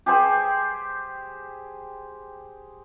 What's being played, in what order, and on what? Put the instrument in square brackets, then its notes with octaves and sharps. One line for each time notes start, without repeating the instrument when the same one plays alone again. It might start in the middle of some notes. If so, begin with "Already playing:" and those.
[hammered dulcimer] G4 G#4 C5 G5